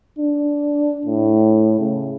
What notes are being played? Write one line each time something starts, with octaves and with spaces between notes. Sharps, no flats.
D4
A2
C#3